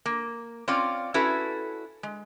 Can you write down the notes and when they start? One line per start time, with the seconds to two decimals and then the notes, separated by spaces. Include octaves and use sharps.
0.06 A#3
0.68 C4 C#4 F4 D5 F5
1.14 C#4 E4 F#4 A4 B4
2.03 G#3